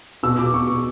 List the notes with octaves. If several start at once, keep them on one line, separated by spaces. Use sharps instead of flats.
B2 E6
B2 D6
B2 C#6
B2